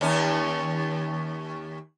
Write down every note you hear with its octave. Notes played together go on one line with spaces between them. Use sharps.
D#2 C#4